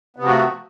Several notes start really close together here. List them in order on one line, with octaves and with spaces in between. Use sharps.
B3 C3 F3 F#4 A3